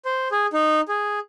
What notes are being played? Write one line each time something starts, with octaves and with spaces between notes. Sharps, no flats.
C5
G#4
D#4
G#4